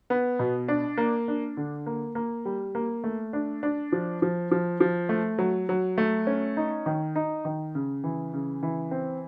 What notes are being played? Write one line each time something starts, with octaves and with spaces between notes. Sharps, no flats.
B3
B2
D4
A#3
D4
D3
A#3
A#3
G3
A#3
A3
D4
D4
F3
F3
F3
F3
A3
F#3
F#3
A3
C#4
D#4
D#3
D#4
D#3
C#3
E3
C#3
E3
C4